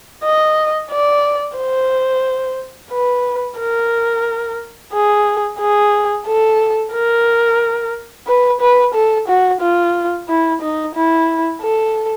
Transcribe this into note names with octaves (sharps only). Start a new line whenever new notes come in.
D#5
D5
C5
B4
A#4
G#4
G#4
A4
A#4
B4
B4
A4
F#4
F4
E4
D#4
E4
A4